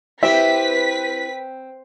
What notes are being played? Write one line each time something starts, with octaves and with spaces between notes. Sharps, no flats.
C4 E4 G4 B4 E5 B6